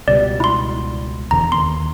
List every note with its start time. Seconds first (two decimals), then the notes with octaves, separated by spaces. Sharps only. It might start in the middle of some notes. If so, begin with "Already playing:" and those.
0.08 C#2 B2 G3 D5
0.40 E4 C6
1.31 E1 E2 D3 A#5
1.52 D#2 C6